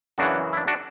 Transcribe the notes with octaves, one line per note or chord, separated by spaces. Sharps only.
F#2 C#3 E3 D4 F#4
E4
D4
D4 F#4